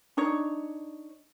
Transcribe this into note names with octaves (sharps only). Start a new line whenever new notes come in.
D4 D#4 C#5